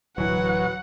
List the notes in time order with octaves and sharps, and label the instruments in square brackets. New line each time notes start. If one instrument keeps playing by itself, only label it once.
[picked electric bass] D1 E3 [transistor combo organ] F#3 [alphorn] B4 [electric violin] F#5